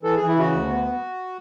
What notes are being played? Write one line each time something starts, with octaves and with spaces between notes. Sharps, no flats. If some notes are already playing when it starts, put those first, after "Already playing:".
E3 A4
E3 G#4
E4
C#3 F#4
D2
B3